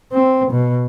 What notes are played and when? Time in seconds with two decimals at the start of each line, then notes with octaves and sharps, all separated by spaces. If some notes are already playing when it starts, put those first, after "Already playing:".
0.12 C4
0.51 B2